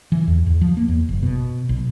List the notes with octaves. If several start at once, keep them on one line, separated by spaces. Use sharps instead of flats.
E3
E2
E2
F3
A#3
E2
F#1
B2
B1